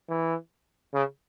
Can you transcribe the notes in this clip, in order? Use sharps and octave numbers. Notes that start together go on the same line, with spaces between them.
E3
C#3